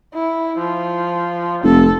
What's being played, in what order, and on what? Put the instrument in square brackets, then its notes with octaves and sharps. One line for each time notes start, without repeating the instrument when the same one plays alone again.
[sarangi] E4
F3
[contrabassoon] F1 [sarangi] A4